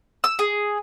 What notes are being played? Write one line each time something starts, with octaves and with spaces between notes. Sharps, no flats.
E6
G#4